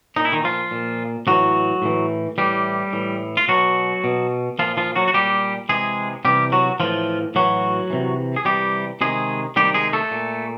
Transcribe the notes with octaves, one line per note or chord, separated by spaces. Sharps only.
A#2 D#4
E4
D#3 D#4
F3 F4
A#2
A2 E3 F#3 F#4
A2 E3
A2 E3 G3 G4
A2 E3
F4
B2 F#3 F#4
B2
A#2 F3 F4
F3 F4
F#3 F#4
F#4
A#2 G3 G4
C3 E3 G#3 G#4
C3 E3 G3 G4
F#3 F#4
A2 E3 F3 F4
A2 E3 F#3 F#4
C3 E3
G#4
C3 E3 G3 G4
C3 D#3 G#3 G#4
C3 D#3 G3 G4
G#3 G#4
A3 A4
A#2